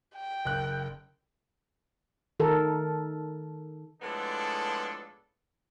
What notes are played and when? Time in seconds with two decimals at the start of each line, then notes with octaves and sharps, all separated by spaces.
0.15 G5
0.45 F#1 F#6
2.40 D#3 A4 A#4
4.02 A2 F3 G#3 B3 D4 A4